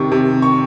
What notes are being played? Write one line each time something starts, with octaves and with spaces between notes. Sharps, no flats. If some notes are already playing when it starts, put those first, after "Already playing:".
Already playing: C3 D#3 C#6
C3
C#6